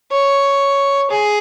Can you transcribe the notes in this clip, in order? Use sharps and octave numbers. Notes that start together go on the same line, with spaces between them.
C#5
G#4